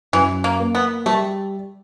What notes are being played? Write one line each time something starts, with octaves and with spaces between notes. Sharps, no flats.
F#2 E3
A#3
A#3
B3
G3 A3